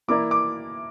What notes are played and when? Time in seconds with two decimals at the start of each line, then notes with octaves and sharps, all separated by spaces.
0.08 E3 A#3 E4 A#4 D5 D6
0.31 D6